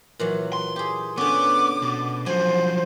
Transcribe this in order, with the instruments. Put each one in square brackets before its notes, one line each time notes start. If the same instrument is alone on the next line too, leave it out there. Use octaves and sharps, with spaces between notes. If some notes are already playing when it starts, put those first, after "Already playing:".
[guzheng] A#2 E3 F#3
[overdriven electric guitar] C6
[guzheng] G4 G#4
[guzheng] D3 C#4 [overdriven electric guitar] B3 [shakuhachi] D6
[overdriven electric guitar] B2
[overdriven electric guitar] F3 F#3 [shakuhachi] C5 [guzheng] G#5